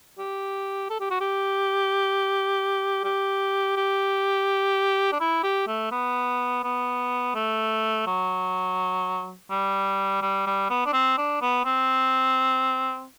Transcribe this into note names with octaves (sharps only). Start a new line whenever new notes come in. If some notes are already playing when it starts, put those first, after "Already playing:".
G4
A4
G4
F#4
G4
G4
G4
D4
E4
G4
A3
B3
B3
A3
F#3
G3
G3
G3
B3
D4
C4
D4
B3
C4